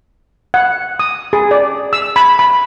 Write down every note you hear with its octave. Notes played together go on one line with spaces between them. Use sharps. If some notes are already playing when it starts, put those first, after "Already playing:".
F#5
D#6
G#4
D5
E6
B5
B5